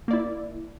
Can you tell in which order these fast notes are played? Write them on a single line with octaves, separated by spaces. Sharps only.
A#3 D5 E4